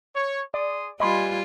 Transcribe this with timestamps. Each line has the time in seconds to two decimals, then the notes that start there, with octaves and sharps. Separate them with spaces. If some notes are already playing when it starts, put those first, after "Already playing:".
0.16 C#5
0.54 G#4 D5 C6 D#6
1.00 G3 F4 B4 D#5 G#5 B5 C6